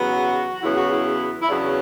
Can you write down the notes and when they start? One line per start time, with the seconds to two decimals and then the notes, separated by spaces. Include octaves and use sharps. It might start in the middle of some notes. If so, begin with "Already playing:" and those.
Already playing: E2 C#3 F#3 B3 F#4
0.63 E2 C#3 F#3 B3 E4
0.77 F#4
0.92 E4
1.42 E4
1.48 E2 C#3 F#3 B3 D4